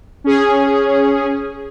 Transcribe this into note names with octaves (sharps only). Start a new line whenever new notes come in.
C#4 G#4